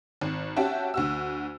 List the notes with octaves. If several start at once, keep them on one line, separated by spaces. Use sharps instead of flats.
G#1
C#4 F#4 G4 E5 G5 A5
D2 F#4 E6